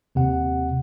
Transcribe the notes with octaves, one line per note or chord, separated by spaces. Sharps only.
D#2 C3 F#5